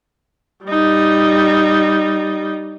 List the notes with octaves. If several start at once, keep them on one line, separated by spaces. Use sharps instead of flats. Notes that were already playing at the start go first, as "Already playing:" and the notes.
G3 D#4